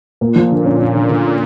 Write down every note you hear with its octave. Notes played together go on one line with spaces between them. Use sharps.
A#2 A#3
F3
D3
C#4
C#4
D3
D3
C#4